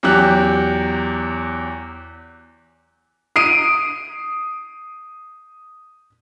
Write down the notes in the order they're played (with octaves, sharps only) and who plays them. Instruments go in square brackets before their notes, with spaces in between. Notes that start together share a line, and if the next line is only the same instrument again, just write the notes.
[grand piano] E2 F#3 G4 F#6
D#6 C7 D7 D#7